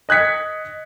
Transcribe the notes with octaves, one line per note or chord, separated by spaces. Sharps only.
D#5 F#6 G#6 B6 C#7